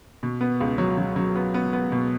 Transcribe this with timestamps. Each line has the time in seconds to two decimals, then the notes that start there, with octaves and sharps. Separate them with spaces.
0.23 B2
0.41 B3
0.61 C#2
0.78 F#3
0.98 F#3
1.16 F#3
1.36 B3
1.54 B3
1.73 B3
1.92 B2